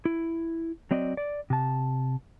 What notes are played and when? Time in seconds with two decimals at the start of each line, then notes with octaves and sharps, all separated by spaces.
0.05 E4
0.91 F#3 C4 D5 D#5
1.17 D5
1.50 C3 A5